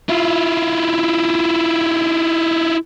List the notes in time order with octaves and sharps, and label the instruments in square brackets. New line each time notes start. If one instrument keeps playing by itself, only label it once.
[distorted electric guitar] E4 F4